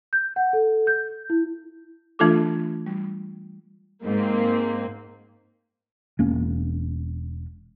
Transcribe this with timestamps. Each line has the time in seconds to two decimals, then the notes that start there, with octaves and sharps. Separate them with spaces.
0.13 G6
0.36 F#5
0.53 A4
0.87 G6
1.30 E4
2.19 E3 A3 D4 F4 A4 D6
2.86 G3
4.05 G#2 A#3 C4
6.19 E1 A#3 C#4